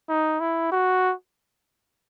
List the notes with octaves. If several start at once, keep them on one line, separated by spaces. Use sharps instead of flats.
D#4
E4
F#4